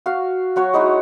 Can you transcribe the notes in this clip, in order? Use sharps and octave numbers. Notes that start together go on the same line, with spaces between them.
F#4 F5
F#3 F#4 C#5
G#3 D#4 E4 F#4